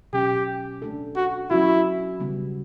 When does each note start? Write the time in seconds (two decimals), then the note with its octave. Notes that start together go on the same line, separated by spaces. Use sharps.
0.13 B2 F#3 C#4 G4
0.82 A3 D4 A4
1.16 F#4
1.51 F#3 C#4 E4 F#4
2.20 C#3 G3 B3